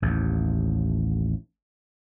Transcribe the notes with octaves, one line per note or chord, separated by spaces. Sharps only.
A1 D#2